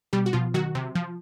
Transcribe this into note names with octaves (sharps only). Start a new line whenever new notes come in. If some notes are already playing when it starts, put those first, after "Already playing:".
B2 G3 G4
F#4
B2 F3 F4
D#3 F#3 F#4
C3
F3